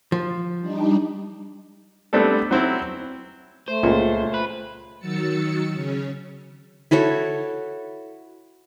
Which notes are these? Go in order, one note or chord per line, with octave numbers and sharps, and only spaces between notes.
F3
G3 D4 D#4
G3 A3 B3 C4 D4 A4
F#3 C4 E4
A3 C5
C#2 A#2
B4
D#3 F#3 E6 A6 C#7
C#3 C#4
E4 F#4 A4 C#5